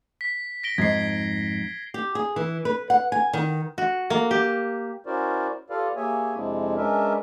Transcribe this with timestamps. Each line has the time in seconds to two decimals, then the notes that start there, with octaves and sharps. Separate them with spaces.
0.21 B6
0.63 A#6 D7 G7
0.78 F2 G#2 G#6 C7
1.94 G4
2.15 G#4
2.36 E3
2.65 B4
2.90 F#5
3.12 G#5
3.33 D#3
3.78 F#4
4.10 A#3
4.31 G4
5.06 C#4 E4 F#4 A#4 C5 D5
5.70 F4 G4 A4 B4 D5 F5
5.96 A#3 G4 G#4 C#5 E5 G#5
6.36 F2 C3 G#3 C4 D4 E4
6.76 G#3 C#4 D4 A#4 B4 E5